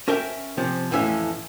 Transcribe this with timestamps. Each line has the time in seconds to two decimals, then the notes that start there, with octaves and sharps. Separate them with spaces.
0.08 C#4 A#4 E5 G5
0.57 C3 F3 C#4
0.91 F2 A2 E3 C#4 E5